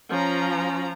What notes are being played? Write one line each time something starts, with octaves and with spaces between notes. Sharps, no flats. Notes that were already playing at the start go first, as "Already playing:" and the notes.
F3 C#4 A#5